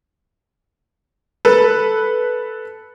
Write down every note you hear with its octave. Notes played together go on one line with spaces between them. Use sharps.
A4 B4